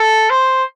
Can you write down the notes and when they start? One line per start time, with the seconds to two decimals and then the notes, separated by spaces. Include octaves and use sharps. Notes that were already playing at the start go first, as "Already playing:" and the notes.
Already playing: A4
0.30 C5